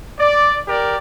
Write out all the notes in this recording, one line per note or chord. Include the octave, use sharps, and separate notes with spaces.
D5
G4 A#4 D5